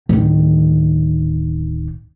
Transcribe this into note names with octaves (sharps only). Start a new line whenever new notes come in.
D1 D#3